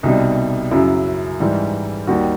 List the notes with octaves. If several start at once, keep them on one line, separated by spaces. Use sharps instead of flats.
C2 B2 G3 D#4
F#2 C#3 F#3 E4
G#2 E3 G3
D#2 D#3 G3 F#4